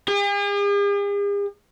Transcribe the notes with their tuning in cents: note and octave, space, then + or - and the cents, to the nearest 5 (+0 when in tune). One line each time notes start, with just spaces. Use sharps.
G#4 -45